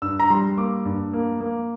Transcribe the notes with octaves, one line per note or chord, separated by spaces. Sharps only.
G2 E6
A#5
G3 C6
A#3 D6
G2
A#3
A#3